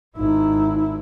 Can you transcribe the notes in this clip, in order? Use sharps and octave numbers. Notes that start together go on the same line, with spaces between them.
G#1 D#4 E4